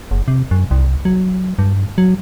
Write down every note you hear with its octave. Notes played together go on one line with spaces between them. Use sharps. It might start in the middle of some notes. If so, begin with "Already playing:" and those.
F#1
C3
F#2
C2
F#3
G2
F#3